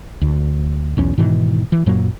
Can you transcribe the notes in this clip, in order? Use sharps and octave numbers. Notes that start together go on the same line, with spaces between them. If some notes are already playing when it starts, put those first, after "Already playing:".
D2
B1 E2 C#4
G#2 B2 D#3 E3
E3
F#2 A#2 F#3 A#3